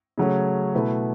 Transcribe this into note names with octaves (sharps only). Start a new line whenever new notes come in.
C#3 F#3 A3 C#4
B2 A3 E4 B4 E5